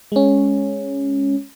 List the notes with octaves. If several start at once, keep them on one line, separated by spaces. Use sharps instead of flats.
G#3 C#4